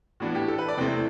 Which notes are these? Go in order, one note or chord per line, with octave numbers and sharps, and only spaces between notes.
A2 E3 B3 D4 F#4
G4
A4
B4
D5
E2 C3 E3 A3 C4 G5